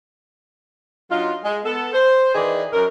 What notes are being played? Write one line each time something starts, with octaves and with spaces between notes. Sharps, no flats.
F#3 D4 D#4 F4
G#3
B3 A4
C5
D#3 E3 D#4 G#4 B4 D5
F#2 A#4